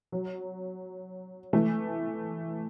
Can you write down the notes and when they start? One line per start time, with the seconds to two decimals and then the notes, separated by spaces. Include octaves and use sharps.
0.12 F#3
1.53 E3 A3